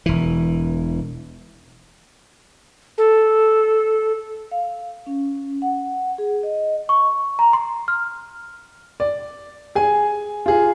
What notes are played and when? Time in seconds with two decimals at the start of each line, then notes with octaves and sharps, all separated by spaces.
0.06 E1 E3
2.98 A4
4.51 F5
5.07 C#4
5.62 F#5
6.18 G#4
6.43 D#5
6.89 C#6
7.39 A#5
7.53 C6
7.88 F6
9.00 D5
9.75 G#4 G#5
10.46 F4 G#4